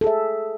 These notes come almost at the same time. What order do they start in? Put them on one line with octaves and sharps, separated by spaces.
A4 G#4 E5